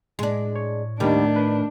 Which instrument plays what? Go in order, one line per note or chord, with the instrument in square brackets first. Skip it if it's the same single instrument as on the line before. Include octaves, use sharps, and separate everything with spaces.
[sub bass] A2 [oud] G#3 D4
[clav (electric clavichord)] C#5
[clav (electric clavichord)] D#2 G3 [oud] D#3 A3 [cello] D4
[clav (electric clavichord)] B4